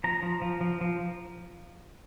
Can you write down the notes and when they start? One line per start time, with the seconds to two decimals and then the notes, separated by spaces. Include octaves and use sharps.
0.04 F3 A#5
0.23 F3
0.42 F3
0.61 F3
0.81 F3